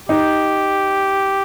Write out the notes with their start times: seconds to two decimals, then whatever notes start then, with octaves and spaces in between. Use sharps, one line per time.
0.09 D#4 G4